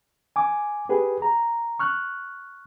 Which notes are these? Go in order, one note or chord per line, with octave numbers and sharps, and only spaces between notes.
G#5 D6
G4 G#4 B4
A#5
C#6 F6 F#6